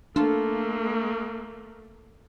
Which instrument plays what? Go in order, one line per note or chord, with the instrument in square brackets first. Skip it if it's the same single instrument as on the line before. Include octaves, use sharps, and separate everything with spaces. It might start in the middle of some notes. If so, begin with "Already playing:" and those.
[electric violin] A3 A#3 [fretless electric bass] D4 [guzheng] F4 A4